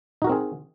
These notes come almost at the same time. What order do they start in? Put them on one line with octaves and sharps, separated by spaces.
D#4 F#4 A#4 C4 G#4